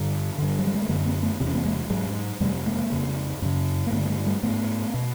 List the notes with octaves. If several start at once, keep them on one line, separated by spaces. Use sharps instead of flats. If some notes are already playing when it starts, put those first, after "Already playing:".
Already playing: G2 D3
G2 D3
F#3
G3
G#3
A3
F#2 D3 G#3 A#3
A#3 C4
A3 B3
E2 C3 C4
C#4
A#3 C4
G#3 A#3
G#2 F#3 G#3
F2 C3 G3 A3
G#3 A#3
F2 C#3
F#2 C#3
A#3
G2 D3 A3 B3
A3
G#3 A#3
G3 A3
G#2 A3 B3
B2